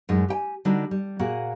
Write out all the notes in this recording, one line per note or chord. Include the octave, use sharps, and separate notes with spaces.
F#2 A2 G#3 D#4
G4 G5 G#5
D3 G3 D4 D#4 F#4
G3
A#2 A#3 F#4 G#4 F#5